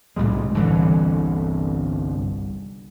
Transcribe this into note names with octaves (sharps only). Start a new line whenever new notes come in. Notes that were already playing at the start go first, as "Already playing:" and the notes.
C2 A2 G3 G#3
G1 C2 D3 E3